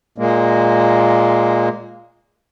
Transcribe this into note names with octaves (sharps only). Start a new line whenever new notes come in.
A#2 G#3 A#3